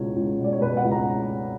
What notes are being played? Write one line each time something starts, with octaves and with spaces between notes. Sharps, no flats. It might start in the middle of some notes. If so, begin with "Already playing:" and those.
Already playing: C#2 B2 C#5
C#2
B2
D5
C#5
B2 B4
F#5
C#2
A#5